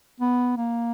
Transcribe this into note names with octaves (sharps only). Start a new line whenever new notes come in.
B3
A#3